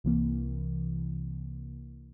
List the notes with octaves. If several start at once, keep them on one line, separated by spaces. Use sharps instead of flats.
C2 C3 E3 A#3